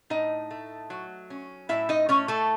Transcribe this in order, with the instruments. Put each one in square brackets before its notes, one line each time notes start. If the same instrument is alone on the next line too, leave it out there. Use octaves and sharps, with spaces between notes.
[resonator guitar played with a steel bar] A2 D#4 D#5
A3
F#3
C#4
A2 E4 E5
D#4 D#5
A3 C#4 C#5
A3 A4